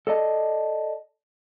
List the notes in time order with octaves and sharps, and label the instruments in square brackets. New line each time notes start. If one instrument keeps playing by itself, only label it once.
[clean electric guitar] A4 D5 D#5 A5